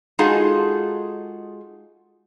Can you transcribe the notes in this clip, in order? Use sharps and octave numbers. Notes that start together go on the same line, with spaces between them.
G#3 D#4 F4 F#4 G#4 A4